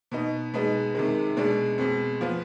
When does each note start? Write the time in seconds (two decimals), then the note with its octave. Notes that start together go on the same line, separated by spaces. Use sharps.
0.11 B2 B3 D#4
0.54 B2 G#3 B3 D#4
0.95 C3 D#3 G#3
1.37 B2 G#3 D4
1.78 B2 G#3 C4
2.21 F3 B3